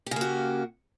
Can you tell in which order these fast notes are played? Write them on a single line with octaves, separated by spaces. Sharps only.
G4 C#3 A#3 F#4